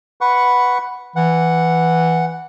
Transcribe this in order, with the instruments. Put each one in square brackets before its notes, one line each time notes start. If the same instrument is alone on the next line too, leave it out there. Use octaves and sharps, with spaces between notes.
[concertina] B4 F#5 C#6
[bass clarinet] E3 [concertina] F#5